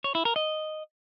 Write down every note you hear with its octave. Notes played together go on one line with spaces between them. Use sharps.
C#5
E4
A#4
D#5